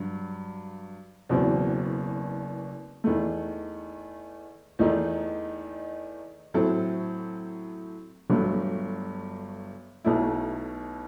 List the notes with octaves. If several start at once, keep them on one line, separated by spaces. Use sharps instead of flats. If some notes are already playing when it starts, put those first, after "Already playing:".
Already playing: G2 F#3
F#1 E2 B2 F#3 C4
E2 D#3 A3
E2 D#3 A3 D#4
A2 F#3 C4 E4 A4
G1 G2 F#3 A3
B1 B2 A3 E4